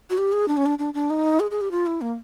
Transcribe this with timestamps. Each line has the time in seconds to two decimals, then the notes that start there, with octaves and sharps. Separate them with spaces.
0.10 F#4
0.18 G4
0.32 G#4
0.48 D4
0.57 C#4
0.66 D4
0.79 D4
0.94 D4
1.10 D#4
1.40 G#4
1.51 G#4
1.61 G4
1.71 F4
1.86 E4
2.01 A#3